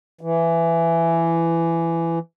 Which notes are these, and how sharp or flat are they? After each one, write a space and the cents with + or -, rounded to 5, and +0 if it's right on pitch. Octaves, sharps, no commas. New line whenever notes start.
E3 +15